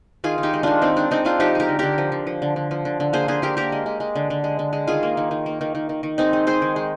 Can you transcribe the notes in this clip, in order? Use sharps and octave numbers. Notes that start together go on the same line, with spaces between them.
D#3 F4 G#4
D#3
D#4 G4
G#3
D#3 D4 F4
D#3 C4 D#4
G#3 D4
G#3 C4 D#4
G#3 D4 F4
F3 D#4 G4
G#3 G4 A#4
D3
D3 G4 A#4
F3
D3
F3
D3
D3
F3
D3
D3
A#3 G#4 C5
D3 G#4 C5
D3 G4 A#4
A#3 G4 A#4
G#3
G#3
G#3
D3
D3
G#3
D3
G#3
D#3 F4 G#4
A#3
D#3
D#3
A#3
D#3
D#3
D#3
D#3
G#3 C4 D#4
G#3
G#3 G#4 C5
D#3
G#3